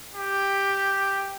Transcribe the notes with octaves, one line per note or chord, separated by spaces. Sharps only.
G4